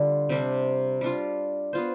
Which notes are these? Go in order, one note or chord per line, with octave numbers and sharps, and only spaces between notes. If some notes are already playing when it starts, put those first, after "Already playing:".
Already playing: D3 G3 D4 F4
C3 G3 D4
G3 D4 F4
B3 F4 C5